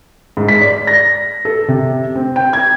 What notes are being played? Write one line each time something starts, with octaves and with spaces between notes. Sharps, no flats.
G#2
B6
D5
A#6
A4
C3
C4
G5
G#6